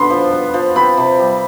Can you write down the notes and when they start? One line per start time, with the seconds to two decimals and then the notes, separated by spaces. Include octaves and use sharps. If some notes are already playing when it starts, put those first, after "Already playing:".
Already playing: D3 B3 B5 C6
0.10 F3
0.32 B3
0.54 F3
0.76 C4 B5
0.97 C3
1.19 G3